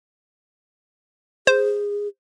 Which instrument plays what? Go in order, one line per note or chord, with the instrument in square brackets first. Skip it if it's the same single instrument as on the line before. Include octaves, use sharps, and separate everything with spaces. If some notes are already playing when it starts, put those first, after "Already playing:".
[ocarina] G#4 [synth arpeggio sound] C5